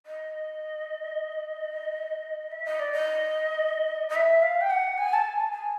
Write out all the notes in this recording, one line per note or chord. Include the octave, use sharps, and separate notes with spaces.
D#5
E5
D#5
D5
D#5
D#5
E5
F5
G5
F#5
G#5
A5
G#5
A5
G#5